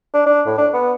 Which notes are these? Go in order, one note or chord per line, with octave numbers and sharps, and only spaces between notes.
D4
D4
A2
D4
B3